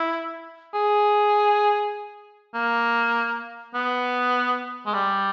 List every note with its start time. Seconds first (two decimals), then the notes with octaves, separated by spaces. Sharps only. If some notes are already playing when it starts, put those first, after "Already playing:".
Already playing: E4
0.74 G#4
2.54 A#3
3.74 B3
4.86 G#3
4.94 G3